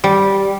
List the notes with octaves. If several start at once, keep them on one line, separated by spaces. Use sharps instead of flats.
G3